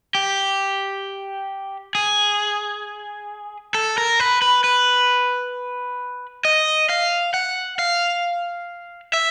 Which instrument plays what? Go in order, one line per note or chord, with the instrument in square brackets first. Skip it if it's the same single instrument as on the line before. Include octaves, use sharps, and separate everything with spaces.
[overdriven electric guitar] G4
G#4
A4
A#4
B4
B4
B4
D#5
F5
F#5
F5
E5